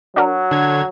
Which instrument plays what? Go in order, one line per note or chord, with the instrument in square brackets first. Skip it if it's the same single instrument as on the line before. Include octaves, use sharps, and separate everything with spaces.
[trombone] F#3 [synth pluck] D4 F#4 A#4
[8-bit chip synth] D3 G#6